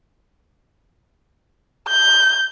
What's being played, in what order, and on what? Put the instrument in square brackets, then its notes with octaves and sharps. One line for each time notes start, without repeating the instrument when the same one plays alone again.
[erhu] G6